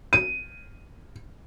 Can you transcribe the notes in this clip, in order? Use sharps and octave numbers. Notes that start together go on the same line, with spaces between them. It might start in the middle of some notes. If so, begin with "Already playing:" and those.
D#7